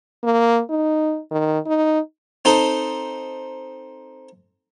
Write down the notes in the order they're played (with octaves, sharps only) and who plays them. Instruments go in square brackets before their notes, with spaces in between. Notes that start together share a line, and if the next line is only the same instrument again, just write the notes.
[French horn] A#3
D#4
D#3
D#4
[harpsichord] C4 D#4 A4